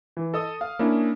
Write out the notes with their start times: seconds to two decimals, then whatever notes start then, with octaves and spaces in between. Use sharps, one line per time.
0.17 E3
0.34 A4 D#5 D#6
0.61 F5
0.79 A#3 C#4 D4 E4